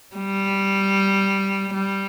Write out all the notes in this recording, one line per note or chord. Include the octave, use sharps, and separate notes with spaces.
G3
G3